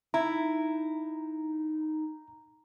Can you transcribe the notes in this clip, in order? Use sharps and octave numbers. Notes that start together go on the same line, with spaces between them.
D#4 E4 A#5